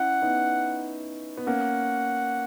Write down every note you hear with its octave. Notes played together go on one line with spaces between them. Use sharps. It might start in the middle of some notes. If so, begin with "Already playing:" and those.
Already playing: C#4 E4 F#5
B3 D#4
B3
A#3 C#4 F#5